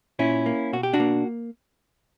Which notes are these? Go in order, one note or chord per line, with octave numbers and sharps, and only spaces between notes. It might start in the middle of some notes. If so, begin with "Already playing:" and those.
A#2 C#4 E4
A#3
B2 F#4
G4
D4 F#4
A#3